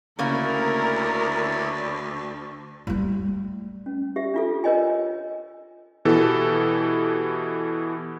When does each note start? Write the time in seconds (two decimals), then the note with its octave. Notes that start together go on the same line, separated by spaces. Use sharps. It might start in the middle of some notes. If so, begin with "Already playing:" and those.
0.19 D2 C#3 A#3 E4 A#4 C#5 D5
2.87 G3 A3
3.86 C#4
4.16 G4 E5
4.34 D4 F4 A4
4.64 A#4 C#5 D#5 G#5
6.05 B2 E3 G4 A4